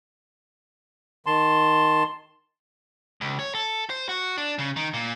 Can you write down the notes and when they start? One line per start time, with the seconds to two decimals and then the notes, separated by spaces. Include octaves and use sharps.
1.26 D#3 A5 C6
3.21 C#2
3.39 C#5
3.55 A4
3.90 C5
4.09 F#4
4.38 D4
4.59 C#3
4.76 D#3
4.94 A#2